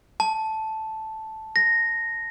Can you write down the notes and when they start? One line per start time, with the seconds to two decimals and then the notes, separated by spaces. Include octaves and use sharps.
0.20 A5
1.56 A#6